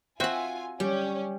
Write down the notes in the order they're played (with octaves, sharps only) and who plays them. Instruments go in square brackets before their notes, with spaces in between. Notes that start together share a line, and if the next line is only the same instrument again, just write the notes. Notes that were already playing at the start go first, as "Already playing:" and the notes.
[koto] C4 F#4 [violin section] F4 G#5 [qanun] E5 F#5
[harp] G3 [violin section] C#4 [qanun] G4